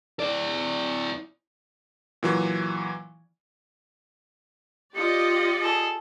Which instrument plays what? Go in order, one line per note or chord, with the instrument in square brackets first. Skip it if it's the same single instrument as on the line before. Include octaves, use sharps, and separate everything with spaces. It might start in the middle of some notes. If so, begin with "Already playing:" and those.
[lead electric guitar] E4 D5
[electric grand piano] A#2 E3 F#3
[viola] F4 G4 [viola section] D5 D#5 [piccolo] C#7
[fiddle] G#4 A4